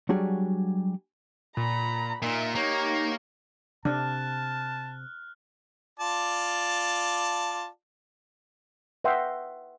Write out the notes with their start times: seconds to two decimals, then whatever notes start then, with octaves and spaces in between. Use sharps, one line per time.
0.09 F#3 G3 D4 F#4 G#4
1.57 A#2 A#5 B5
2.22 A#2 D#4 E5
2.55 A#3 D#4 G4 C#5
3.85 C3 D4 A5 F6 F#6
5.99 F4 D5 A5
9.04 B4 D#5 E5 F#5 G5 C6